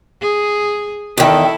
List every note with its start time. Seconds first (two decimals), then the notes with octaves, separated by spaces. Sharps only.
0.21 G#4
1.17 E2 D#3 E4 A4